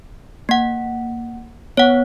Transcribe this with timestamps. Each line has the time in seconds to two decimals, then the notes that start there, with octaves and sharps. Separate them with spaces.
0.49 A#3 F#5
1.77 B3 C#5 F#5